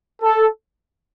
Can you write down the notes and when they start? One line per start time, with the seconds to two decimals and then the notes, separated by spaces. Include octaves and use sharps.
0.23 A4